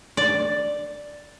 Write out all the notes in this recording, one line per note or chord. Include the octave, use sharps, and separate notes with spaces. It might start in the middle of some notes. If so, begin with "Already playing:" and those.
D5